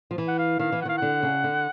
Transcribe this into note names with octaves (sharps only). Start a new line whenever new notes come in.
F3
E3
F#5
F5
D#3 F5
E3
F#5
D#3 F5
D3 F#5
C#3
D3